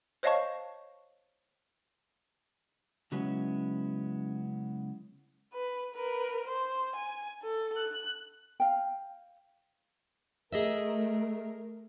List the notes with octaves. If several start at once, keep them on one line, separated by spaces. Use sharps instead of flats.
C5 C#5 D#5 F5 A5 C#6
C#3 F#3 G#3 B3 C#4 E4
B4
A#4 B4
C5
G#5
A4
F#6
F5 G5
A3 G#4 A#4 D#5 E5